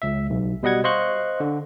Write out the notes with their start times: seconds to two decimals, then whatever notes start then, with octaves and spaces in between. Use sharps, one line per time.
0.02 C#2 E5
0.30 B1
0.63 B2 G3 D#5 F#5 G#6
0.84 C5 D#5 F5 C6 C#6 F#6
1.40 D3